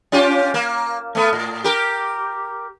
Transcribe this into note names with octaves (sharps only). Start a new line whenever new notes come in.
C#4 F4 G4
A#3
A3 B3
A2
G4 A#4